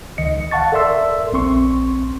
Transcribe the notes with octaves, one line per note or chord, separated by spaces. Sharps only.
C#2 D#3 D#5 C#7
F5 F#5 A5 C#6 A6
A4 A#4 D5 E5 C6 E6
A#1 C4 C6 C#6